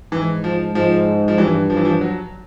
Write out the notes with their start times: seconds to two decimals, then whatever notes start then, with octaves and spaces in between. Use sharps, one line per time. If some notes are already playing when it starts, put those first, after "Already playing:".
0.12 G#2 E3
0.44 F3
0.75 G#2 F3
1.28 F3
1.38 G2 E3
1.70 F3
1.77 E3
1.85 F3
2.01 F#3